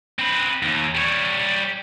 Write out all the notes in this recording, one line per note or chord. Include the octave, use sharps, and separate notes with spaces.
C4 B4
D#2
G3 C#5